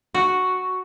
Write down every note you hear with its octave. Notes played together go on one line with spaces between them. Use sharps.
F#4